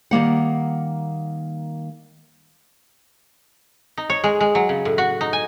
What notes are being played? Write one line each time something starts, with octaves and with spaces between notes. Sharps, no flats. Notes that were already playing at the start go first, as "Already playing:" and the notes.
D#3 G3 A#3 F#5
D#4
C#5
G#3
G#3
F#3
C#3
A2
F#4
D#4
G#5